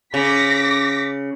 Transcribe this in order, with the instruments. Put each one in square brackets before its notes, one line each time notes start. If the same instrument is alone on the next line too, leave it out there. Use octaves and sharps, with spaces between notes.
[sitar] C#3 [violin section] D6 A#6 B6